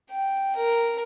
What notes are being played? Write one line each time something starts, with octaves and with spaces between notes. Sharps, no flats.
G5
A#4